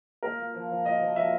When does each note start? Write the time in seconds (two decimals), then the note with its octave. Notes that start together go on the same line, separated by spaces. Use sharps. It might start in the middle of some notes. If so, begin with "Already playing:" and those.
0.23 A#2 A#4
0.39 A#3
0.54 F3
0.70 F3
0.85 A#2 D#5
1.01 F3
1.16 F3 E5